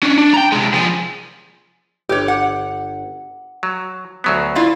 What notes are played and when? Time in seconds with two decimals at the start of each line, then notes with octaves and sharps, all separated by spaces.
0.03 C#4 D4
0.18 D4
0.34 G5 A#5
0.52 C3 G#3
0.74 F3 G#4
2.09 G1 G4 C#5
2.28 F#5
3.63 F#3
4.24 D2 F#3 B3
4.55 E4 F4 D5